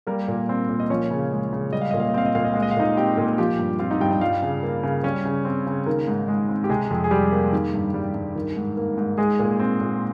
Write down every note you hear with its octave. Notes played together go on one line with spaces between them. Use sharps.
G3 A#3 A#4
A#2
C4
A#2
D#5
F3 C#4 C#5
C#3
G#3
C#3
G3 D#5
F5
A#2 D#5
F5
D#5
C4 F5
D#5
A#2 F5
D#5
G#3 F5
D#5
F5
A#2 D#4 D#5
C4 G4 G5
A#2
F3 G4 G5
G2
C4 F4 F5
D#4 D#5
G2 G4 G5
D#4 D#5
G3 F4 F5
C#3
A#3
C#3
G3 C#4 C#5
C#3
C4
C#3
D#3 A#3 A#4
G#2
G#3
C4
G4
C3 G#3 G#4
F2
G#4
G3 G4
A#3
D#3
G2
G3
G2
D#3
G#2
A#3
G#2
G#3 G#4
A#2
C4
A#2